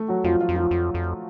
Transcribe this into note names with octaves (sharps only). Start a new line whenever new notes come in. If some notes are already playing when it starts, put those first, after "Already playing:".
Already playing: A3
F#3 F#4
F2 F3 F4
F3 F4
F2
F3 F4
F2
F2